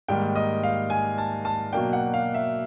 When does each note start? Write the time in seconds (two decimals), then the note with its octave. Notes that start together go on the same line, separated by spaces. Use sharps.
0.08 G#2 D#3 G3 A#3 G5
0.36 D#5
0.63 F5
0.90 G#5
1.18 A5
1.45 A5
1.72 B2 F#3 A#3 D4 G5
1.93 F#5
2.14 F5
2.34 E5